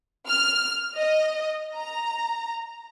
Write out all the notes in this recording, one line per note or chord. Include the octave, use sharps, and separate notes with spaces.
F6
D#5
A#5